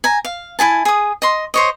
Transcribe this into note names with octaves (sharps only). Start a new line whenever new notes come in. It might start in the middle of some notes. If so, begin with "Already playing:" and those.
G#5 A#5
F5
E4 G#4 G#5 A5
G#4 D#6
D#5 C6
C5 C#5 D#5